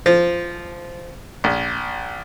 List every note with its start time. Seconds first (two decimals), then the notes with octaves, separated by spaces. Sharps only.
0.06 F3
1.44 A#1